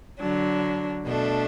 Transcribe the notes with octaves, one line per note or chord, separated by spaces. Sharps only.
D3 F#3 D4
B2 A3 D4